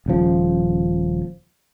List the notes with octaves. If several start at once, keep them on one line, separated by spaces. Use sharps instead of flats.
D#1 C#3 F3